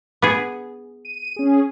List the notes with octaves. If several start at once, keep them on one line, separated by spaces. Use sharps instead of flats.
B3 G#4
D#7
C#4 G#4